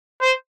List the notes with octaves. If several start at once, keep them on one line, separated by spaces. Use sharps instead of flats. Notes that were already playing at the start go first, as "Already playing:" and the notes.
C5